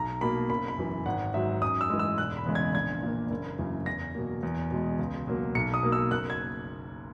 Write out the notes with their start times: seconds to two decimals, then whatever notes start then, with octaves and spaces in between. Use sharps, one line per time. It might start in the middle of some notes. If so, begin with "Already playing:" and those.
Already playing: B1 A#5
0.21 B2 A#3 B5
0.49 F#1 B5
0.68 B5
0.78 F#2 E3
1.06 G#1 F#5
1.34 G#2 F#3 E5
1.62 F#2 D#6
1.81 E6
1.90 E3 G#3
1.99 E6
2.18 E1 F#6
2.37 B5
2.46 E2 C#3 G#3
2.55 G#6
2.74 A#1 G#6
3.02 A#2 A#3
3.30 F#1
3.59 F#2 C#3 E3
3.86 E2 A#6
4.15 B2 F#3 A#3
4.43 E2
4.71 B2 G#3
4.99 C#2
5.27 B2 F#3 A#3
5.55 B1 C#7
5.74 D#6
5.83 B2 A#3
5.92 E6
6.11 F#1 F#6
6.30 G#6